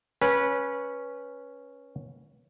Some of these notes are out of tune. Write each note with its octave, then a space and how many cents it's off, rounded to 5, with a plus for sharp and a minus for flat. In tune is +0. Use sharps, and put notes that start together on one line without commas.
C#4 +0 B4 -20